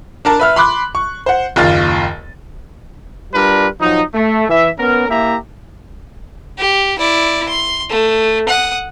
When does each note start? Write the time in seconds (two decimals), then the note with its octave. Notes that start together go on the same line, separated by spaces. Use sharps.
0.25 D4 A#4 A5
0.39 B4 E5 F6
0.56 B5 C6 D6 F#6
0.95 C#6
1.26 C5 F#5
1.56 F#1 D#2 F4 A6
3.34 G3 D4 F4 A#4 B4
3.80 F3 F#3 D#4
4.13 A3
4.49 E3 E5
4.77 B3 C#4 A#4
5.08 A#3 E4 G4 E5 A#5
6.58 G4
6.98 E4 D5
7.49 C6
7.90 A3
8.48 F#5 D#6